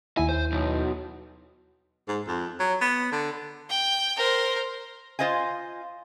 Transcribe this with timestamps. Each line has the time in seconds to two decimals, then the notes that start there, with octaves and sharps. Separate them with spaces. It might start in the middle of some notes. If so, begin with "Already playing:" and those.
0.17 D#2 E4 G#5
0.29 C5
0.52 B1
2.08 G#2
2.28 F2
2.60 F#3
2.81 B3
3.12 D3
3.70 G5
4.17 A#4 C5
5.19 F4 C5 D#5 F5 G#5